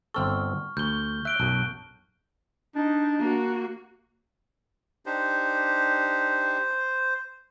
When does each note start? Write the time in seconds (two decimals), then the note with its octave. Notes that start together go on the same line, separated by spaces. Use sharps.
0.14 G1 C4 A4 C#6 F6
0.77 D2 G6 G7
1.25 E5 F#6 D7 G7
1.40 B1 F#2 A5
2.76 D4 D#4
3.19 A#3 F#4
5.06 D4 D#4 G4 C5